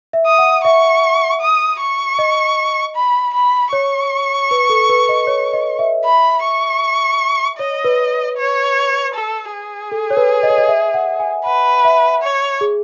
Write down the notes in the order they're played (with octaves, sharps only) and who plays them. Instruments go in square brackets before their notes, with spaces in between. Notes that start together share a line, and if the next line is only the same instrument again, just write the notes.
[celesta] E5
[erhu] D#6
[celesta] F#5
[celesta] E5 [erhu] C#6
[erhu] D#6
C#6
[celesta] D#5
[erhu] B5
B5
[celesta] C#5 [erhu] C#6
[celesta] B4
A4
B4
D#5
C#5
D#5
E5
[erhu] B5
C#6
[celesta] C#5 [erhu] D#5
[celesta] B4
[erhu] C#5
A4
G#4
[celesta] A4
C#5
B4
D#5
C#5
D#5
E5
F#5
G#5
[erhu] B4 [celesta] F#5
[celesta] E5
[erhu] C#5
[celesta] G#4